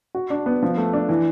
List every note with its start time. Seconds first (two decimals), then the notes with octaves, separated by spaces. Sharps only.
0.15 F#4
0.30 D4
0.46 B3
0.63 F3
0.77 A3
0.93 D4
1.09 E3